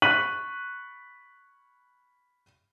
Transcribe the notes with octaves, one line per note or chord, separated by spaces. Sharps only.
B5 C#6 F#6 B6 D#7 F#7